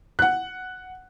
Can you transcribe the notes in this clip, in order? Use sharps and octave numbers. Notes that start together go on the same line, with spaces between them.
F#5 F#6